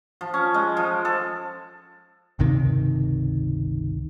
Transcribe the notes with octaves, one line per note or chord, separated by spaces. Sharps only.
F3
C#4
G#3
F3
A4
G1 C#2 C3 D#3